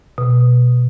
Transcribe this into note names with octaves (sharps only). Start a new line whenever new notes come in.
B2